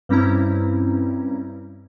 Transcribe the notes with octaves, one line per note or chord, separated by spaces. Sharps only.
G2 G3 C4 C#4 E4 A#5